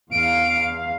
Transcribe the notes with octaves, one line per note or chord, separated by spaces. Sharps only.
E2 F5 D7